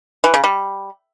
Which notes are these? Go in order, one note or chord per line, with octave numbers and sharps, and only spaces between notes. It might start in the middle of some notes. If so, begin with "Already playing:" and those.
E3
C#3
G3